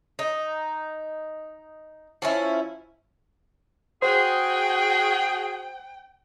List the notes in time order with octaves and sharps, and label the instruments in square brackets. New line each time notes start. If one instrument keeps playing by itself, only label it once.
[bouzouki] D#4
F3 C#4 E4
[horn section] F#4 G#4 [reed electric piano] C5 [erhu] G5